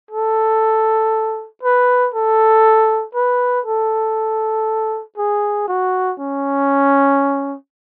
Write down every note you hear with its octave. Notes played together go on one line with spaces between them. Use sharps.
A4
B4
A4
B4
A4
G#4
F#4
C#4